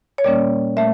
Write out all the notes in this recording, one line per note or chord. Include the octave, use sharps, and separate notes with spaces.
C#5
A#2 G3 A#3 C#4 D5
A#2 A3 E5